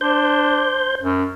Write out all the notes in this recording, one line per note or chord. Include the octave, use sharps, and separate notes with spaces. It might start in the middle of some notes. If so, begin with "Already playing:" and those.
D4 C5 G6
F#2